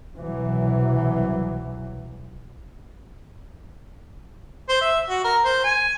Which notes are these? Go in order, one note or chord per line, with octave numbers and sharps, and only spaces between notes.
C2 B2 E3 F#3
C5
E5
F#4
A#4
C5
G#5